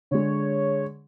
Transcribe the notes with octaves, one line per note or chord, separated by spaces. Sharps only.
D3 G#3 C#5